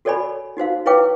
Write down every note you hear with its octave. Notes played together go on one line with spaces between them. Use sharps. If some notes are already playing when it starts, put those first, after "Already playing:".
F#4 A4 C#5 D5 G#5 B5
D#4 F#4 C5 F5
E4 B4 C#5 F5 G5 D6